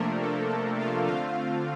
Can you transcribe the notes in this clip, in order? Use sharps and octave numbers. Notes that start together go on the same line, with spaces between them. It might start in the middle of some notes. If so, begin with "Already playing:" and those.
Already playing: C3 F3 A3 A#3 D4 A#4
A4
A4
F4 F5
D3 A3 C4 F4 F5